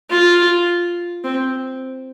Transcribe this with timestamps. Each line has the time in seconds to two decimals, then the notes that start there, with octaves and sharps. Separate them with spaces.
0.10 F4
1.24 C4